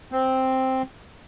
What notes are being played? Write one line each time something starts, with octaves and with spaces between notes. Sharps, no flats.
C4